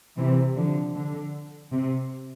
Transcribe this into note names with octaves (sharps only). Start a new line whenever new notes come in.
C3 E3
D3 F3
D3
C3